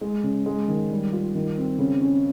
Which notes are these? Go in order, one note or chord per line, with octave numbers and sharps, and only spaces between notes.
G#3
C#3
G#3
D#3
G3
F4
D#3
C4
C#3
C#4